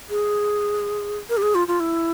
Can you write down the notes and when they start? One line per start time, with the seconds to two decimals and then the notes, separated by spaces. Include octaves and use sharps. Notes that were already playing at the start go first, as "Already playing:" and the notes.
0.10 G#4
1.29 A#4
1.37 G4
1.42 G#4
1.55 F4
1.68 F4
1.80 E4